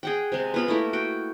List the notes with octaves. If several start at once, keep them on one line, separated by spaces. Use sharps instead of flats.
G#4 F#5 G5
C3 G#3
B3 F4 B5
A3 A#3 E4 G4
F#4 G5